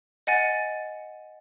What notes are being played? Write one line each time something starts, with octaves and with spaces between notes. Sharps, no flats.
D#5 F#5 G#5 A6